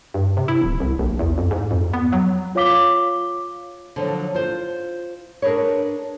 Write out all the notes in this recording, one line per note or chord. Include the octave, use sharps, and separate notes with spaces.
G2
C3
E4
D1
C2
A#1
E2
F2
G#2
F2
B3
F#3
F4 C#5 F5 D6 B6 G7
D3 F3 F#3
F4 C5
D4 G#4 A#4 B4 C#5